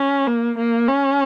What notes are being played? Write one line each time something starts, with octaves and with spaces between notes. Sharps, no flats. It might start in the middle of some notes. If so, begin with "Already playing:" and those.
Already playing: C#4
A#3
A#3
C#4